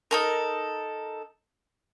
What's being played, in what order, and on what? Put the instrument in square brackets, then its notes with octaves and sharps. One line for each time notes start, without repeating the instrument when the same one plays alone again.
[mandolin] D#4 A4 A#4